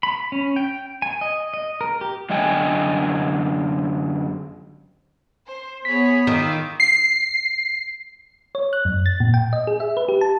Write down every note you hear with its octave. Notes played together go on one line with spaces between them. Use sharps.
B5
C#4
G5
G#5
D#5
D#5
A#4
G4
F#2 D3 D#5 G5 G#5
C5
B3 G#4 C#5 B5 B6
D#3 F4 D6 E6
C7
C#5
F#6
F#2
A6
A#2
G5
D#5
G#4
E5
B4
G4
A5